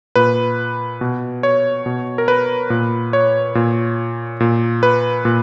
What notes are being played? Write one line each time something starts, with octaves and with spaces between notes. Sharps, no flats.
A#2 B4
B2
C#5
B2
A#4
B4
A#2
C#5
A#2
A#2
B4
A#2